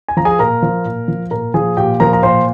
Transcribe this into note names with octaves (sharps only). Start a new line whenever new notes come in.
G#5
F3 A#5
G#4 G#5
A#2 A#4 A#5
F3
A#2
F3
A#2 A#4 A#5
F3 G#4 G#5
A#2 G4 G5
F3 A#4 A#5
A#5
A#2 C5 C6